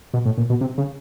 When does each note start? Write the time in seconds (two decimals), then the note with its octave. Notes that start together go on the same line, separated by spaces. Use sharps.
0.14 B2
0.26 A2
0.38 A#2
0.50 B2
0.61 C3
0.78 C#3